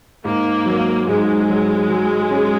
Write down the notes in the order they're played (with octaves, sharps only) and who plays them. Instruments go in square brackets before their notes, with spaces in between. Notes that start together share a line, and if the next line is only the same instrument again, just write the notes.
[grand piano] G#2 [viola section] A#3
[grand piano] F#3
[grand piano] G#2 [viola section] G#3
[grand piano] F#3
F#3
C#4